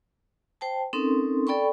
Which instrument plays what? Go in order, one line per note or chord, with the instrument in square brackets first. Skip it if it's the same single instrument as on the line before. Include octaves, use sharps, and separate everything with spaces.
[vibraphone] C5 G5 A5
C4 C#4 D#4 A4 A#4 C6
A4 D5 G5 B5 C#6